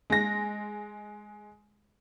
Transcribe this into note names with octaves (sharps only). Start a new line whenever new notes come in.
G#3 A#6